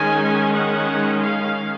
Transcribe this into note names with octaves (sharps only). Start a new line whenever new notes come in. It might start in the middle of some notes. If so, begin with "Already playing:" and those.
Already playing: D#3 G#3 C#4 G#5
F#5
F5